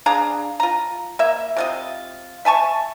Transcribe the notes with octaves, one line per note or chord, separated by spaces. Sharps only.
D4 G#4 F5 A#5
F4 A#5
A#3 E5
C3 F4 D#5
E5 G#5 A5 C#6